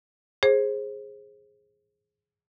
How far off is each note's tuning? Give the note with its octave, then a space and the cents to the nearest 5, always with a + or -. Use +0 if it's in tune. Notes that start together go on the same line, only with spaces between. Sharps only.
G#4 +0 C5 +30